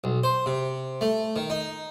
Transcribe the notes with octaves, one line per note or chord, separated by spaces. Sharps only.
B1
C5
C3
A3
D#3
D#4